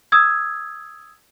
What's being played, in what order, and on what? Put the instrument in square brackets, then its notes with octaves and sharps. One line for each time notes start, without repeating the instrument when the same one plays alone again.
[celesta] D#6 E6 G#6